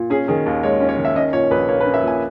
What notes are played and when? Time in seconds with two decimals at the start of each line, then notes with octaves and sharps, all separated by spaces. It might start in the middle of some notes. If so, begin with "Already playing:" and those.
Already playing: A#2
0.10 C#4 G#4
0.28 D#3 G#4
0.46 D#2
0.63 G#3 C#5
0.81 C#4
0.89 C#5
0.97 D#3
1.05 E5
1.16 C#4 D#5
1.33 A#2 C#5
1.51 A#1 B4
1.68 A#3 C#5
1.80 B4
1.86 C#4
1.94 E5
2.03 A#2 G#5